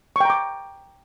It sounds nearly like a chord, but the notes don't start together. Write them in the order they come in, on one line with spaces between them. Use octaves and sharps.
C#6 G5 A#5 D6